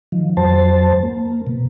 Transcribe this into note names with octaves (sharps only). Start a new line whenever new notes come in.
D#3 F3
F2 F#3 C5 A5
A#3
B2